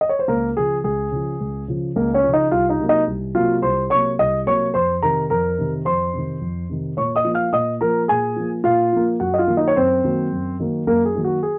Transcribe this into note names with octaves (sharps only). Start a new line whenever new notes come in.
D#5
C#5
C5
C#2 A#3 A#4
C#3 F3 G#4
C#2 G#4
C#3 F3
C#2
C#3 F3
C#2 A#3 A#4
C#4 C#5
C#3 F3
D#4 D#5
C2 F4 F5
D#4 D#5
C3 F#3 A#3
D#4 D#5
C2
C3 F#3 A#3 F4 F5
C2 C5 C6
C3 F#3 A#3 C#5 C#6
C2 D#5 D#6
C3 F#3 A#3 C#5 C#6
F2 C5 C6
C3 D#3 A#4 A#5
F2 A#4 A#5
C3 D#3
F2 C5 C6
C3 D#3
F2
C3 D#3
A#2 C#5 C#6
D#5 D#6
F3 A#3
F5 F6
A#2 D#5 D#6
F3 A#3 A#4 A#5
A#2 G#4 G#5
F3 A#3
A#2 F4 F5
F3 A#3
F#2 F#4 F#5
D#5
F4 F5
D#3 F#3 A#3
D#4 D#5
C#5
F#2 C4 C5
D#3 F#3 A#3
F#2
D#3 F#3 A#3
F#2 A#3 A#4
G#4
D#3 F#3 A#3
F#4
G#4